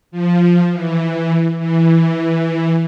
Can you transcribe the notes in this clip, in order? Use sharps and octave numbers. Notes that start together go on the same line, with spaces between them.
F3
E3
E3